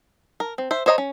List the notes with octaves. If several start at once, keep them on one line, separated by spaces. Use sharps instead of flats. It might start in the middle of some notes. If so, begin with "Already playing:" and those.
A#4
C4
C5 E5
C5 C#5 D#5 F5 A#5
C#4